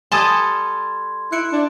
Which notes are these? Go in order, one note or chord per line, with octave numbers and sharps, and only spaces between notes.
G3 A4 G#5 A5 C6 D#6 G#6
E4 F#6 C#7 D7
D4